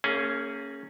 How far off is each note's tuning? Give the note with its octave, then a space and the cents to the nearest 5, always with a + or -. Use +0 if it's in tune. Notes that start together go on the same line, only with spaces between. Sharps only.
A#3 -35 C#4 +0 G#4 +0